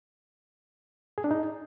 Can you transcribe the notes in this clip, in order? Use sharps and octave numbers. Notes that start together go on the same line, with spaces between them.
G#4
D4
D#4